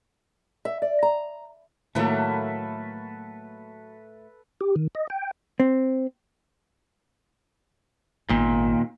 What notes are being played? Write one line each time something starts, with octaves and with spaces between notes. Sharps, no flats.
E5
D5
A#5
A2 D#3 F#3 A3 A#3 A4 B4 E5
G4
D#3
D#5
G5
C4
G#1 D#2 A#2 B3